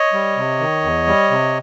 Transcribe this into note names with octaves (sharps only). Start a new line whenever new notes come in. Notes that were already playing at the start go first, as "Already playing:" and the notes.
Already playing: C#5 D#5
G3
C3
D#3
E2
G3
C3